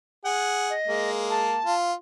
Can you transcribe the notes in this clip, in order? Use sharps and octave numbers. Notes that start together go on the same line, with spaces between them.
G#4 F#5
D#5
G#3 A#3
A5
F4